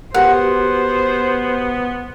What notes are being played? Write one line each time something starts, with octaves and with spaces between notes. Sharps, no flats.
B3 F#4 G4 A#4 C5 F#5